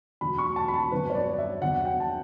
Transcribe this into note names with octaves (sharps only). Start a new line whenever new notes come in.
E1 D2 D3 F#3 B5
C#6
A5
B5
A5
G1 F#2 D3 B4
C#5
D5
E5
E2 D3 F#3 F#5
G5
A5